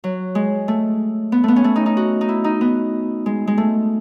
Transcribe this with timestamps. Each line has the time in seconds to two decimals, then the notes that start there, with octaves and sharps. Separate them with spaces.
0.04 F#3
0.35 G#3
0.68 A3
1.32 B3
1.44 A3 B3
1.56 C#4
1.64 A3
1.76 D#4
1.86 D#4
1.97 F#4
2.21 D#4
2.29 E4
2.44 D#4
2.61 B3
3.26 G#3
3.47 G#3
3.58 A3